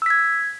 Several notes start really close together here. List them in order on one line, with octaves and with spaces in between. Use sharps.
E6 B6 G#6